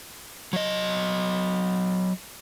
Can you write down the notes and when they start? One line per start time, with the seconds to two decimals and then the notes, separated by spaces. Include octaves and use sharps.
0.53 F#3 D#5